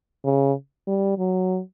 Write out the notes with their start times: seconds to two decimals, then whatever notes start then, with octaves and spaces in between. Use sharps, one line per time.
0.25 C#3
0.87 G3
1.18 F#3